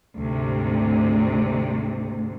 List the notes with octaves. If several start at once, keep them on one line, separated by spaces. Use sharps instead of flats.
D2 G#2 C3